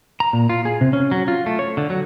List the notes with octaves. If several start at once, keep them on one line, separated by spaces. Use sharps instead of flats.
A#5
A#2
F4
G#4
C3
C#4
F#3
F4
A3
C#5
D3
F#3